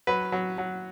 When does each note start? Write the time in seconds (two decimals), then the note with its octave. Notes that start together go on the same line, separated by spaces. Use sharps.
0.07 F#3 B4
0.32 F#3
0.58 F#3